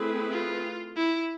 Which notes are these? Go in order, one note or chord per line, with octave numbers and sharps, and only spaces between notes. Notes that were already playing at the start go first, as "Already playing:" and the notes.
Already playing: A3 C4 E4 G#4 B4
F4
E4